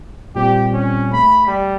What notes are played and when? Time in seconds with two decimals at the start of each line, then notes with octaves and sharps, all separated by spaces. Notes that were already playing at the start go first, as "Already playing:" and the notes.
0.35 A#2 G3 C4 G4
0.73 C#4
1.13 A3 B5
1.47 G3